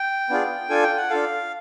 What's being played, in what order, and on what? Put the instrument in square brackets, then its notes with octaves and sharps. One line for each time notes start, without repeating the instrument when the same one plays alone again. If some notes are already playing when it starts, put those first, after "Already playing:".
Already playing: [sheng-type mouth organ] G5
B3 D4 F4 G#4
D4 F4 A4 G#5
G5
F#5
D4 F4 A4 F5